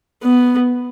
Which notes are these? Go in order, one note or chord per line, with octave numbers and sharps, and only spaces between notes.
B3